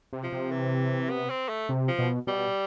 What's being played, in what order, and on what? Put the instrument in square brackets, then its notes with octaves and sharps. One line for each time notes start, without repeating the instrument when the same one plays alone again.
[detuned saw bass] C3
[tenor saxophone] F3
[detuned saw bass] C3
[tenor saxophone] E3
B3
C4
A3
[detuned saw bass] C3
[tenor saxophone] F3
[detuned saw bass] B2
[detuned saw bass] B2 [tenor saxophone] G3